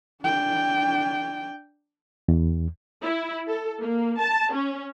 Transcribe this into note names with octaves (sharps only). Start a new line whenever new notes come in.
D4 G5
E2
E4
A4
A#3
A5
C#4